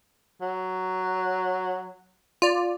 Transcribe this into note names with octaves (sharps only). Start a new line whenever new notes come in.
F#3
F4 D5